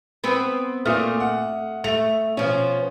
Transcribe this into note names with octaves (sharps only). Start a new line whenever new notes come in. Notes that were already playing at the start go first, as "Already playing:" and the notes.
B3 C4 B4
A#2 A3 D#6 F6
F#5
A3 F7
B2 F3 C#4